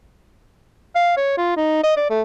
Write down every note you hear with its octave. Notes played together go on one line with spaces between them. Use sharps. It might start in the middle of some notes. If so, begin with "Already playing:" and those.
F5
C#5
F4
D#4
D#5
D5
A3